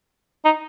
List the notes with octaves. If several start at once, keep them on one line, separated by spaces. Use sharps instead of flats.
D#4